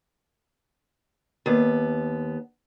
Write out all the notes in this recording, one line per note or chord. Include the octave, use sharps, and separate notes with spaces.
D#2 B3